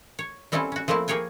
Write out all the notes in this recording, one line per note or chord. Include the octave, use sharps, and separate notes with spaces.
C#5
G3 C4 C#4 E4 F4 A4
C#4 F#4
F3 A3 A#3 C4 E4
A#3 G#4 C#5 G5 G#5